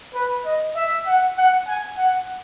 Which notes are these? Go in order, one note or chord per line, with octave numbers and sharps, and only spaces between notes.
B4
D#5
E5
F#5
F#5
G#5
F#5